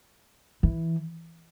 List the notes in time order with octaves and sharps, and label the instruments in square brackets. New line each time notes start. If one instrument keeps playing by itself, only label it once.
[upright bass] E3